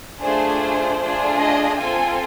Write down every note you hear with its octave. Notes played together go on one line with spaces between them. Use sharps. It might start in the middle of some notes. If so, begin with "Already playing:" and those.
A3 D4 F4 G#4 C5
A3 D4 F4 G#4
D#5
C4 F4 A4 G#5